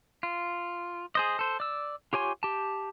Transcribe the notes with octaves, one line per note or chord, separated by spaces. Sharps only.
F4
G#4 C5 D#5
A4 C5
D5 E6
F4 G4 C#5 G#5 C6
G4 A5